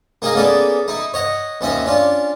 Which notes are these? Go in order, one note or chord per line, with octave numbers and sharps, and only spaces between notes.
A#3 D#4 G#4 A#4 D#5 F5
A#3 B3 C#4 G#4 A4 D5
D#4 E4
C#5 D#5 F#5
D#2 F3 C#4 D#5 E5
C#4 D4 F4